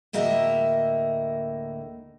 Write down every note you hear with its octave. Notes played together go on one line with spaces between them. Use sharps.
D2 A2 A#3 A#4 D#5 E5